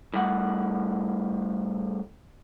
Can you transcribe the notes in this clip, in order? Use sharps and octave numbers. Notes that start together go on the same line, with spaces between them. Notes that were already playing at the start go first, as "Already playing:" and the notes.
A2 G3 F#5